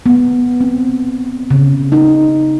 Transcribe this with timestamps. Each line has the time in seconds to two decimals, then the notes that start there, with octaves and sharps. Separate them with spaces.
0.06 B3
0.60 C4
1.51 C#3
1.92 D#4